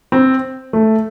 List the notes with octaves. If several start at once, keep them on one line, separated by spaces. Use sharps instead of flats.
C4
A3